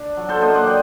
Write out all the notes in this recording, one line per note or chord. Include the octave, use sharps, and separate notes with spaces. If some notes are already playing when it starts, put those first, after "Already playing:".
Already playing: D4
F#3
A4 C5
A#3 C5 D#5
D5 F#5
D#5 G5